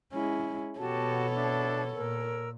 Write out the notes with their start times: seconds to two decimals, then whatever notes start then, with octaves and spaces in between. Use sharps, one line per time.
0.13 G#3 C#4 E4
0.78 B2 B3 F#4 G4 A4 C#5 A5
1.34 D4 E5
1.95 A#2 A#4 E6